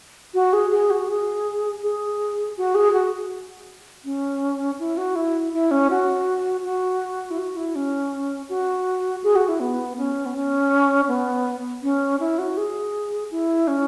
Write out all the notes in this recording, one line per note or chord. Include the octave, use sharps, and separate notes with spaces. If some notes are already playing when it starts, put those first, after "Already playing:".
F#4
G#4
G#4
F#4
G#4
G#4
F#4
G#4
F#4
C#4
E4
F#4
E4
E4
C#4
F#4
F#4
E4
F#4
E4
C#4
F#4
G#4
F#4
E4
B3
C#4
B3
C#4
B3
C#4
E4
F#4
G#4
E4
C#4